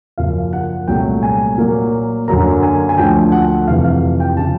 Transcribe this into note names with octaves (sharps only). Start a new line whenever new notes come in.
F#2 C#3 F3 A#3 F5
F#5
C2 A#2 F#3 A3 G5
G#5
A#2 F#3 A#3
F#2 D3 F#3 A#3 A#5
G#5
G#5
D2 D3 F3 A3 G5
F#5
F2 C3 E3 F5
F5
G5
C#3 F3 A5